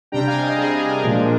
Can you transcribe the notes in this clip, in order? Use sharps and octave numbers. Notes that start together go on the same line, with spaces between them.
C3 G3 D4 G5 A#5
F5 G#5
D#5 G5
C3 G3 D4 G#4
G#4
A#4
A#2 F3 G#3 D4